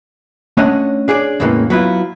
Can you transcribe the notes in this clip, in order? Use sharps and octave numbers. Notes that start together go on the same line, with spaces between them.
A3 C#4 D4 C#5 D#5 F#5
D4 G#4 C#5 D5
E2 A2 C#3 E3 G#3 A#3
F#3 B3 E4 F4